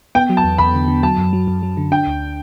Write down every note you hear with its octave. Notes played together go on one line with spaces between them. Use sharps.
B3 G5
F#3
A5
E2
E2 B5
D3
D3
F#3 A5
F#2
F#3
F#2
F#3
D3
D4 G5
D2